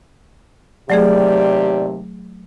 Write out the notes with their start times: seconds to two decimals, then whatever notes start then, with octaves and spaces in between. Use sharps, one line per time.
0.90 D#2 C3 F#3 A3 G4 G#4 D5